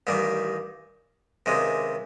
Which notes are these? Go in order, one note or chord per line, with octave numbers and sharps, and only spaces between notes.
A1 G2 D#3 G3
C#2 C3 D#3 G#3